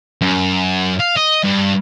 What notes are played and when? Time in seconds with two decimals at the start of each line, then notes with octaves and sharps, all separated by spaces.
0.21 F#2
1.00 F5
1.17 D#5
1.44 G2